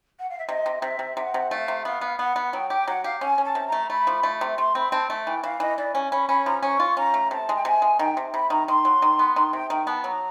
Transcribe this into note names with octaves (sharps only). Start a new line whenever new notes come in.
F#5
F5
E5
C3 D#5
C3
C3 E5
C3
C3 F#5 G5
C3
A3 F5
C3
B3 F5
B3
B3 F#5
B3
F#3 G5
G4 G5
F#3 F#5
G4 F5
C#4 G#5
C#4
A5
C3
A#5
A3
A3 B5
F3
A3
C3
A3 C6
C4 B5
C4 A5
A3 A5
E3 G5
E3 F5
E3 D#5
E3 D5
C#4 G#5
C#4 B5
C#4 B5
F3 A#5
C#4 C#6
F4
C#4 A#5
A3
C3 A5
G#3
G5
C3 G#5
G#3
D#3 G5
C3
C3 B5
D#3 A#5
D#3 C6
F#3
D#3
B3
D#3 C6
C3 G5
D#3 G5
B3 A5
F#3 A#5